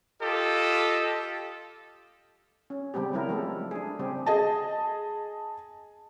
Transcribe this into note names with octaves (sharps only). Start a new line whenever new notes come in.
F4 G4 A4 D#5
C#4
C#3 G3 B3 C4 G4
F#3 G3 B3 E4 A#4
F3 G#3 A3 A4
D4 G#4
C#3 G3 C4 G4
G#4 D#5 A5